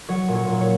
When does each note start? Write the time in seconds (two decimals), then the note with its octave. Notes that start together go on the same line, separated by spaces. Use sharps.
0.09 F#3 C#5
0.28 A#2
0.35 C#5
0.48 A#2
0.61 C#5